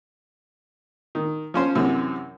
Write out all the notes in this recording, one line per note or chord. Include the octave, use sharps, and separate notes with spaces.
D#3
F3 C#4 C5
F#2 C3 E3